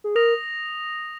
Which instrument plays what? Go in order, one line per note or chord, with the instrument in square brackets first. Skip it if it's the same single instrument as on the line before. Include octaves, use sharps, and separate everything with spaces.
[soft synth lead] G#4
[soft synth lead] A#4 [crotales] D#6 A#6 F7